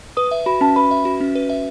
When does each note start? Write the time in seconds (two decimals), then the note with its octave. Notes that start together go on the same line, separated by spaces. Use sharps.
0.17 B4 D#6
0.31 E5
0.46 F#4 B5
0.61 C#4 A5
0.76 B4 B5
0.91 E5
1.05 F#4
1.21 C#4
1.35 B4
1.50 E5